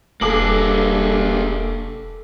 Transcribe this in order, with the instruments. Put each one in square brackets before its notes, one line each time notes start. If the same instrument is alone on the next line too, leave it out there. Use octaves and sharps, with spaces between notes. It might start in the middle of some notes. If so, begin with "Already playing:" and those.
[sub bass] E1 [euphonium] G2 [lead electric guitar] A#3 G#4 [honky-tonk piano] A4 D6 F#7